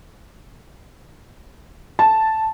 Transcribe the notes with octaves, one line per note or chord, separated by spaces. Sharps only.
A5